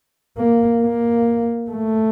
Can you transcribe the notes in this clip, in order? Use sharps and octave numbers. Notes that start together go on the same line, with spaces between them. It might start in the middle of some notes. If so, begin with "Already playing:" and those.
A#3
A#3
A3